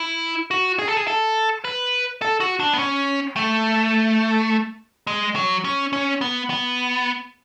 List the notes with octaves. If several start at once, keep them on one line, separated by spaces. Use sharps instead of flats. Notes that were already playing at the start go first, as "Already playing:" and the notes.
Already playing: E4
F#4
G#4
A4
G#4
A4
B4
A4
F#4
D4
B3
C#4
A3
G#3
F#3
C#4
C#4
B3
B3